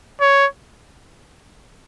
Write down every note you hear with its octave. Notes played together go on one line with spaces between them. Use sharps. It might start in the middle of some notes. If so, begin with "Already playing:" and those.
C#5